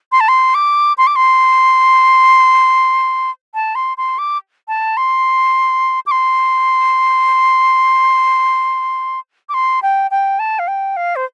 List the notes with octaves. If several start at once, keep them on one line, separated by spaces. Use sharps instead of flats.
C6
A5
C6
D6
C6
D6
C6
A5
C6
C6
D6
A5
C6
D6
C6
D6
C6
G5
G5
A5
F5
G5
F5
C5